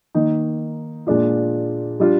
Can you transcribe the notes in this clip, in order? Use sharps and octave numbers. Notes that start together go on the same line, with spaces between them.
D#3 A#3 D#4
A#2 G#3 D4 F4
G3 D4 F4